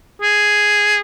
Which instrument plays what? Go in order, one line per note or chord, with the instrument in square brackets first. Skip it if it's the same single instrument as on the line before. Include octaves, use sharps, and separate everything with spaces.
[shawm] G#4